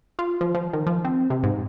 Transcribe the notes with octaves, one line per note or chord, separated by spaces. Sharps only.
F4
F3
F3
D#3
F3
C4
C3
G#2